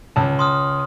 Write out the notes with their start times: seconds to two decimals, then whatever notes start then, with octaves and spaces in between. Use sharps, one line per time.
0.16 C#2 A5
0.39 C6 D#6 F6